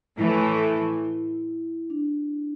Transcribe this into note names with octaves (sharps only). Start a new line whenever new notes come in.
A2 E3 A3 E4
E4
D4